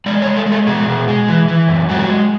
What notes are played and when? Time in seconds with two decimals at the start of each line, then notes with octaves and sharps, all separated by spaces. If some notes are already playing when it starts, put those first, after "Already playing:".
0.06 G#3 D5
0.22 C#5
0.27 G#3
0.36 A4
0.46 G#3
0.52 A4
0.67 B2 G#4
0.87 B2
1.08 G#3
1.28 E3
1.48 E3
1.69 F#2
1.89 G#3 F#4
2.09 G#3